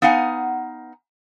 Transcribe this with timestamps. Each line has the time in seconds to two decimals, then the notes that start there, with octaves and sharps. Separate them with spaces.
0.02 B3 D#4 F5 F#5 G#5